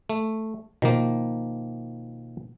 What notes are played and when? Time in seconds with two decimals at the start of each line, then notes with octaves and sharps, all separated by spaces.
0.09 A3
0.82 B2 D#3 F3 A#3